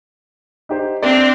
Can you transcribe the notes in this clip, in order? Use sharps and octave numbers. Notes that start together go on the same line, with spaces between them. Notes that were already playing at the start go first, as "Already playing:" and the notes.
D#4 G4 C5
C4 D4 D5 E5